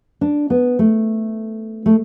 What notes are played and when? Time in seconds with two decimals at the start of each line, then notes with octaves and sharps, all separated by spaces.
0.21 D4
0.50 B3
0.79 A3
1.86 A3